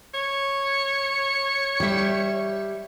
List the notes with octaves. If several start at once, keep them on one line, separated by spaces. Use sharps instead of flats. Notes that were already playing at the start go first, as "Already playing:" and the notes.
C#5
G3 E5